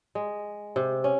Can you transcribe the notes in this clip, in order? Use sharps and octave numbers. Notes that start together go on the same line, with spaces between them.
G#3
C3
C#4